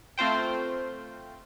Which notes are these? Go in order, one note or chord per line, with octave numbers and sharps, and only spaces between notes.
A3 C4 F4 C5 G5